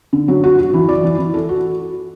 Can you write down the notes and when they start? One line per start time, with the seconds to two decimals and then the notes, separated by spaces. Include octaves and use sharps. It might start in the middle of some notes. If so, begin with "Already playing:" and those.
0.13 D3
0.28 F#3
0.44 F#4
0.58 F#4
0.74 E3
0.89 D5
1.04 E3
1.18 E3
1.34 A4
1.49 F#4